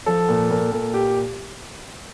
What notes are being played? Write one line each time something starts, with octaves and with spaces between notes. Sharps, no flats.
F3 A4
A#2
A#2
A#2
G4